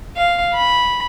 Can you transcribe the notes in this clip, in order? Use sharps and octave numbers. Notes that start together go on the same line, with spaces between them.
F5
B5